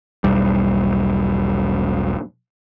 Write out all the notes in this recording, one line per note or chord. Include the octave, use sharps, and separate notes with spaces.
E1 B1 G3